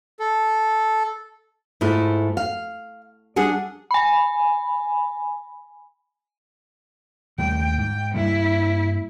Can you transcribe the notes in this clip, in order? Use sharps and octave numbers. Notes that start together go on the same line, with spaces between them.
A4
G#2 A3 E4 F4
F5
G3 D4 G#4 F#5 G#5
G#5 B5
D#2 G3 A3 G5
G#2 G5
G2 G3 A#3 E4